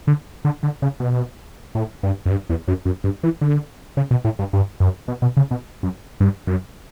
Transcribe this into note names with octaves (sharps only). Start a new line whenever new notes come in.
D3
D3
D3
C#3
B2
A2
G2
F#2
G2
E2
F#2
F#2
G2
E3
D3
C#3
B2
A2
G2
G2
F#2
B2
B2
C#3
B2
F#2
G2
F#2